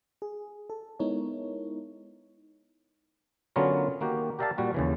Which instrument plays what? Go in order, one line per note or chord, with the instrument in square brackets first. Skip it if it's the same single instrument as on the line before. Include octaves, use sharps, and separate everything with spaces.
[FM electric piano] G#4
A4
G#3 B3 D#4 E4 A#4 C#5
[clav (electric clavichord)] D3 F#3 B3 C#4 F4 A#4
D#3 A#3 F#4 G4
G4 A#4 D5 E5 F5 A5
A#2 G3 F#4
D#2 C#3 E3